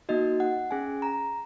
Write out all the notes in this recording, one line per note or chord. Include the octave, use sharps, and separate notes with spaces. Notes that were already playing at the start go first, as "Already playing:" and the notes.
A#3 D#4 F#4 D#5
F#5
C#4 G#4 G#5
A#5